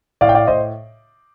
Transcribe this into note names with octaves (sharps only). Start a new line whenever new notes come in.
A2 D5 F5
G5
D5 F5
A2 C5 D#5